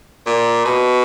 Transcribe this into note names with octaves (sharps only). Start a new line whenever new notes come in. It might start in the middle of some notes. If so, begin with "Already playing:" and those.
A#2
B2